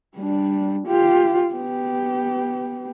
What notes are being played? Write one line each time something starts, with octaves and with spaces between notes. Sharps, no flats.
G3 D4
F4 G4
B3 G4